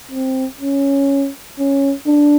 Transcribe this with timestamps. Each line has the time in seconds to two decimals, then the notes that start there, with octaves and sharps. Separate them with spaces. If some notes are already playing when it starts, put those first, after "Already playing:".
0.11 C4
0.60 C#4
1.58 C#4
2.07 D4